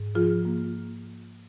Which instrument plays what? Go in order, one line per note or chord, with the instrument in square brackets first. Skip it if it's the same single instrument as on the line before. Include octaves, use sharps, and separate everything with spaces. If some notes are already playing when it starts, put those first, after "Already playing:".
Already playing: [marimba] G#2
F3 F4 G#4
A#3